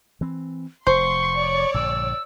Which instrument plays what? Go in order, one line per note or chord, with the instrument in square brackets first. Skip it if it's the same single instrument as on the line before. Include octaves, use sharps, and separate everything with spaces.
[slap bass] E3 C4
[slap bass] F1 [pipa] C5 [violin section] C6 [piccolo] C#6
[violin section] C#5 D5
[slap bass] A#1 G2 D3 [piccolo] E6